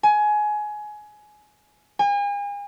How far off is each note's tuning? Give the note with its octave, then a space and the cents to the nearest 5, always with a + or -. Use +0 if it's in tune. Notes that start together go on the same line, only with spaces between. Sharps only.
G#5 +20
G#5 -40